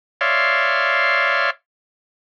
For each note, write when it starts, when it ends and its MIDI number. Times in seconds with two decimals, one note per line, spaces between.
0.21 1.50 73
0.21 1.50 74
0.21 1.50 76
0.21 1.50 77
0.21 1.50 84